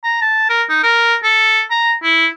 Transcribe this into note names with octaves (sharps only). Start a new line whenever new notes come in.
A#5
A5
A#4
D#4
A#4
A4
A#5
E4